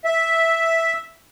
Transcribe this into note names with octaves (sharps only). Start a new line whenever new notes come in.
E5